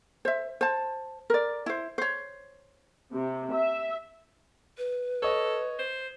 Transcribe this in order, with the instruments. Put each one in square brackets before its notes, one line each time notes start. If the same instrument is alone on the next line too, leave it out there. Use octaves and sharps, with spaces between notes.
[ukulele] C5 E5
C5 A5
A#4 D5
E4 C5
C5 C#5
[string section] C3
E5
[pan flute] B4
[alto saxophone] A4 [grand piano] C#5 D#5
[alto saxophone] C5